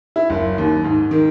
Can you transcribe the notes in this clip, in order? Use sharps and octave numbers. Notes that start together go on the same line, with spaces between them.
E4
F#1
D#2
G#2
D#3